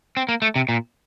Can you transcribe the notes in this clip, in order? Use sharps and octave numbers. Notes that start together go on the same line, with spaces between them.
C4
A#3
A3
C3
A#2